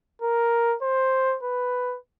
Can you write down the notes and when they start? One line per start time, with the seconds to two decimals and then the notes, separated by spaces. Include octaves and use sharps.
0.22 A#4
0.82 C5
1.43 B4